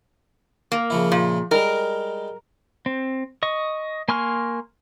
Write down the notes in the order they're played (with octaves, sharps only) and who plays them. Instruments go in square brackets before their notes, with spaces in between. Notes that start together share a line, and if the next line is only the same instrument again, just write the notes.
[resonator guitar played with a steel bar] A#3
[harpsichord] C#3 F3 E4
[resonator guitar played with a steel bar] A#2
[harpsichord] G3 G#3 [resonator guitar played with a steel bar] A#4
[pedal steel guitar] C4
D#5 C#6
A#3 G#5 C6 C#6 F6